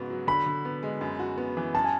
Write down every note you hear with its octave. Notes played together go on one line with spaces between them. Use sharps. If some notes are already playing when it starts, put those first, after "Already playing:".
Already playing: G#2 C#3 B3 F#4
F#3
D3 B5
D3
B3
G#3
F#2
F#4
B3
E3
F#2 A5
G#5